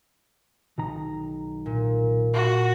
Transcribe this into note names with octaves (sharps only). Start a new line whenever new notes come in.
B1 D#3 A#5
A#2
F#4